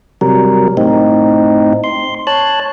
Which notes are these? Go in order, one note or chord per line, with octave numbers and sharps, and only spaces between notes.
C3 F#3 G3 A#4
A2 C4 D#4
C6
C#5 A5 F#6